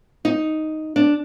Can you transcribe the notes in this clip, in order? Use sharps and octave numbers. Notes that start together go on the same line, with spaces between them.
D#4
D4